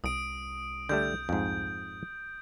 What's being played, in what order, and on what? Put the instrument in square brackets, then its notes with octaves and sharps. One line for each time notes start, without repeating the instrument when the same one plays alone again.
[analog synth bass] C2 [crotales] D#6 D7
[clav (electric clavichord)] D3 G3 A3 [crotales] G6
[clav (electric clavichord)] F2 G#2